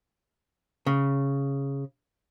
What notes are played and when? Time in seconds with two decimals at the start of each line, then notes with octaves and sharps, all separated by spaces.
0.86 C#3